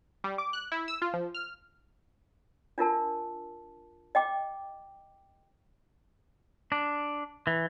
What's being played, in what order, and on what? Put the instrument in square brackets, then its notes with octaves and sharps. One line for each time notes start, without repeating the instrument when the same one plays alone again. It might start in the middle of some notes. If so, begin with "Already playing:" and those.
[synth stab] G3
D6
F#6
E4
E6
F4
F3
F6
[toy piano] D4 F4 A#4 A5
D#5 G5 D6
[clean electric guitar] D4
E3